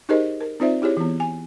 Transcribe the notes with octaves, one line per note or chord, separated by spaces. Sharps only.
D#4 G4 G#4 A#4 C5 D#5
A#4
C4 D#4 F4 C5 D5 E5
E4 G4 G#4 C#5
E3 B3
G#5